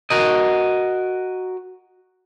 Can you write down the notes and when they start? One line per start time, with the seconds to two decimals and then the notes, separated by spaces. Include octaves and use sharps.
0.10 F#4 A#4 D#5